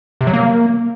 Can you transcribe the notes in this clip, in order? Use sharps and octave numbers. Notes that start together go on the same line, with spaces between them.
C3
F#3
A#3